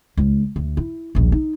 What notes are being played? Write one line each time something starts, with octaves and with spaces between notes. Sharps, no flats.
C#2
D2
E4
D#1 A#1
D#4